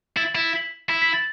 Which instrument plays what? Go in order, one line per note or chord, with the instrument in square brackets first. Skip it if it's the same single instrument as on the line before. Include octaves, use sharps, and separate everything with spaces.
[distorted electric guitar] E4 [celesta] A6
[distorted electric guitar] E4
[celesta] B6
[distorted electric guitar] E4 [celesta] B6
[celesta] B6
A6